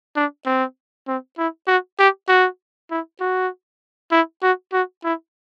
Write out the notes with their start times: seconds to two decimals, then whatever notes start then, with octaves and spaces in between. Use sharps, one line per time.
0.16 D4
0.46 C4
1.08 C4
1.38 E4
1.68 F#4
1.99 G4
2.29 F#4
2.91 E4
3.20 F#4
4.12 E4
4.43 F#4
4.73 F#4
5.04 E4